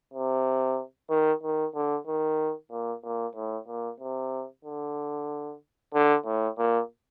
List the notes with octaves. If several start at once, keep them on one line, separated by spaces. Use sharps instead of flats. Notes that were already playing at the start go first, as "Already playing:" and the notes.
C3
D#3
D#3
D3
D#3
A#2
A#2
A2
A#2
C3
D3
D3
A2
A#2